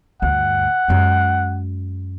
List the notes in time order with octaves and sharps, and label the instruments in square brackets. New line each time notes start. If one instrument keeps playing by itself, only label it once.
[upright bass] D2 G2 [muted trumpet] F#5
[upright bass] F#2 G#3